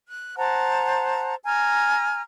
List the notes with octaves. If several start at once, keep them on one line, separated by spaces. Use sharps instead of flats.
F#6
C5 F#5 A5 A#5
G#5 A#5 F6